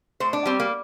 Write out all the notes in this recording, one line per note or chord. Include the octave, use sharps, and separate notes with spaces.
A2 C5
D4
G3 C4
A#3